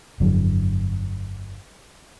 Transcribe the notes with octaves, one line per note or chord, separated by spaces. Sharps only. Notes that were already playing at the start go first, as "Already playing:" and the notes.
G1 F2 D3 F#3